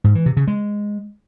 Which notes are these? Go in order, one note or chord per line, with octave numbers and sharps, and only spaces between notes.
G#2
E3
C3
C#3
G#3